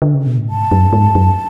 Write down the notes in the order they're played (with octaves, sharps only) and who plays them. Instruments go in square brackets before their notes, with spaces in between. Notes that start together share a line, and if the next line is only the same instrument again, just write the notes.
[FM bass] D3
C#3
B2
A2
[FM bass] G#2 [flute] A5
[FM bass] F#2
G#2
F#2